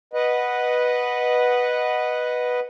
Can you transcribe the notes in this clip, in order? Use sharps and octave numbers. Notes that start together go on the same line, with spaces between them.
B4 D#5 F#5